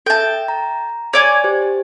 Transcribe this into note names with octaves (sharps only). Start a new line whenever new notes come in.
A4 E5 G5 A5
A#5
C#5 D5 G#5 D6
G4 C5